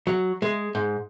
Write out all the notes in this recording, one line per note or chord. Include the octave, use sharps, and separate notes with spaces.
F#3
G#3
G#2